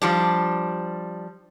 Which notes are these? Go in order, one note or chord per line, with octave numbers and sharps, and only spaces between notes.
F3 G3 D4